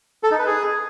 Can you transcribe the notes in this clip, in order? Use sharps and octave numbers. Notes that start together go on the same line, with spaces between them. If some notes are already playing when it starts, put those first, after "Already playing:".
A4
D#4
B4
G#4